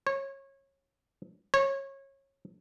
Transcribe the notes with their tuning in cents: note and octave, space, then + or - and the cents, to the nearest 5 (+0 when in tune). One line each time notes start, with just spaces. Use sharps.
C#5 -25
C#5 -25